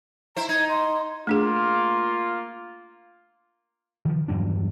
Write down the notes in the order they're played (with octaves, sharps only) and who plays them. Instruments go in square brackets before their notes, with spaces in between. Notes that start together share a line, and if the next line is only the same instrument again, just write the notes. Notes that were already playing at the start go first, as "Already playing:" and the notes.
[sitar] E4 C5 [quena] A#5
[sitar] D#4 [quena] G#6
[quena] C6
[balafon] A3 D4 G#4 [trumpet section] A#3 F4
[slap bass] D#3 F3
E2 G2 F#3 D4